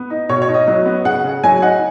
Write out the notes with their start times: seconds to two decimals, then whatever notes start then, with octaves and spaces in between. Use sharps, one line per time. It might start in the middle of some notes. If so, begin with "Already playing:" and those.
Already playing: B3
0.10 D#4
0.29 B2 C#5
0.42 C#5
0.48 D#4
0.54 D#5
0.68 F#3
0.86 B3
1.05 C#3 F#5
1.24 C#3
1.44 F#3 G#5
1.62 D#4 F#5